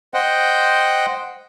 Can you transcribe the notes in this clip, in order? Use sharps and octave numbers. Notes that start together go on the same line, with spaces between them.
C5 D#5 F#5 G5